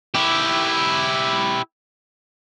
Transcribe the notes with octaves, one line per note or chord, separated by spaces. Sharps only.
E4 G4